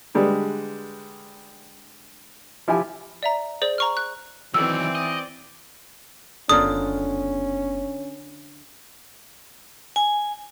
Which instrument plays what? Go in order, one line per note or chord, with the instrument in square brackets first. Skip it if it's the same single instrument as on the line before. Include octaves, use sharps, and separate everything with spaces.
[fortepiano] D3 G3 G#3 B4
F3 E4 G4 G#5
[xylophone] D5 E5 A#5
G#4 C5 D5 F#7
A#5 C#6 F6
F#6
[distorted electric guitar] D#3 F#3 [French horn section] E3 [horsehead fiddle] C4 D5 [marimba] E6
[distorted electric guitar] D#5
[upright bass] F#1 B3 [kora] D3 F4 A#4 [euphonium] C#4 [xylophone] D#6
[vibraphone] G#5